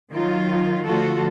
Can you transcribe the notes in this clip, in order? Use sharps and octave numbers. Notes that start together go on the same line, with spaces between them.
D#3 F#3 F4
D3 F3 A3 F4 F#4 A4